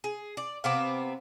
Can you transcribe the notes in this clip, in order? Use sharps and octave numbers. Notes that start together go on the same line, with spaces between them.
G#4
D5
C3 B3 C4 F5 D6